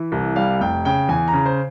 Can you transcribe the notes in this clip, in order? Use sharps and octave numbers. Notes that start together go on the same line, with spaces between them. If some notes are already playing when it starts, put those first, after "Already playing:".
Already playing: E3 E5
C2
G3 F5
F1 G5
C#3 G5
E2 G#5
A#5
C#3
C5